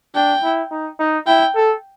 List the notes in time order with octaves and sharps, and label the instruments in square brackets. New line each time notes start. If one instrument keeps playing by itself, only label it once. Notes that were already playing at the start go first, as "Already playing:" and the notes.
[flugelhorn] D4 [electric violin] G5
[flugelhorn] E4
D#4
D#4
[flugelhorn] E4 [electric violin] G5
[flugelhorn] A4